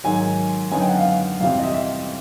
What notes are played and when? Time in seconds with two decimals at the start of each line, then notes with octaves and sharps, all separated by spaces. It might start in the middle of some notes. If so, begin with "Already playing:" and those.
0.04 G#2 D#3 F#3 G#5
0.72 F#2 D3 F#3 B3 D#4 G#5
0.80 G5
0.89 F#5
0.98 F5
1.40 F2 C3 E3 G3 C4 F5
1.59 D#5
1.64 E5
1.74 E5